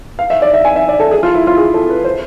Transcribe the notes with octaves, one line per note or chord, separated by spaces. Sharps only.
F5
E5
D5
E5
G#5
E5
D5
A4
G#4
F4
E4
F4
G#4
A4
B4
C5